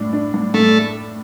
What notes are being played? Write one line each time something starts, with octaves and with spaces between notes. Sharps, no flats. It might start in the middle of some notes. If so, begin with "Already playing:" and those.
Already playing: A2 D4
D4
A2
A2 A3